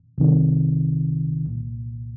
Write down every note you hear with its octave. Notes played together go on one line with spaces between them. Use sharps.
C2 C3 D#3
C2 A#2